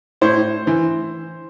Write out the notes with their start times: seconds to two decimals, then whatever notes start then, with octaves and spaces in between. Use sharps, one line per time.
0.21 A2 C5
0.67 E3